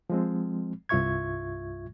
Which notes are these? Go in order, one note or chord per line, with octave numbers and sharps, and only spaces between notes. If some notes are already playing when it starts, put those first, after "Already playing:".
F3 G#3 C4
C2 G2 F4 E5 C#6 G#6